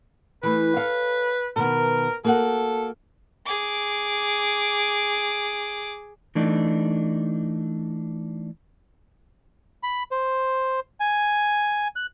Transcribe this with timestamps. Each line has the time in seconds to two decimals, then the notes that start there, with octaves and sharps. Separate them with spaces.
0.43 E3 A3 B4
0.77 A4 C#5 F5
1.56 B2 D#3 B3 A#4
2.25 A#3 F#4 A4 F#5
3.46 G#4 D6
6.35 E3 A3 D4 D#4
9.83 B5
10.11 C5
11.00 G#5
11.96 F#6